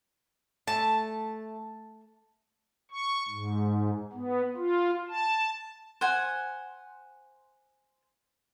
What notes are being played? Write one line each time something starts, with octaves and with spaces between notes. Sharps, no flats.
A3 A5
C#6
G#2
B3
F4
A5
C5 F#5 G#5